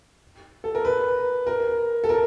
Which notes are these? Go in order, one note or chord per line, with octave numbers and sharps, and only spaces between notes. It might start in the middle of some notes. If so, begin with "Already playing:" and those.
A4
A#4
B4
A#4
A4
A#4